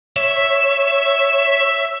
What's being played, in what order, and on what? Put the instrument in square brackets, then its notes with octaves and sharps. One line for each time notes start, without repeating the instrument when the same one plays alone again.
[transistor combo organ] C#5 [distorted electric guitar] E5